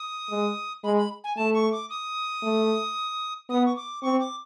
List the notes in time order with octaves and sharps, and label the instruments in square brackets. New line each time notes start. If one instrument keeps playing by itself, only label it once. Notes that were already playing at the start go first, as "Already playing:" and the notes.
Already playing: [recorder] D#6
[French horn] G#3
[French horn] G#3 [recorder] B5
[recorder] B5
G#5
[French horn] A3 [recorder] A5
[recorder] C#6
D6
D#6
[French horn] A3
[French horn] B3 [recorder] D#6
[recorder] C#6
D6
[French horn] C4 [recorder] C#6
[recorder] D6